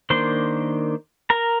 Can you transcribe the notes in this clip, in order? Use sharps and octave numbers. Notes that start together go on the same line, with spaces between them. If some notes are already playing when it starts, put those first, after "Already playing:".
D#3 A#3 D4 C5 C6
A#4 A#5